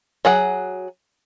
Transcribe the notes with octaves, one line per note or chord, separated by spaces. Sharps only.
F#3 G#4 F#5